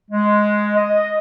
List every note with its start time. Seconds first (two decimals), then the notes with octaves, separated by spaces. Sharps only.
0.11 G#3
0.76 D#5